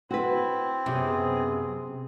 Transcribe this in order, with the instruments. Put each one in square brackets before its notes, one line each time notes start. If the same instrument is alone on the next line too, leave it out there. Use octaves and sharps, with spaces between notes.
[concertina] C4 [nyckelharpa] E4 [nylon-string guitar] F#4 B4
[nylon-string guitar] F#2 [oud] C3 [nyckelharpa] B3 G#4